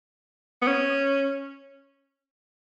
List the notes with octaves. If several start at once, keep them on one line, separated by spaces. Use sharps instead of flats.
B3
C#4